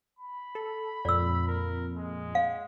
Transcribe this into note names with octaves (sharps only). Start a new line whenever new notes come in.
B5
A4
F2 A#2 D5 E6
A#4
G#3
F5